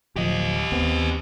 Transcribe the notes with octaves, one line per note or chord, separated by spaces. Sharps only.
D1 F3 G4 D#5
D#2 B3 C4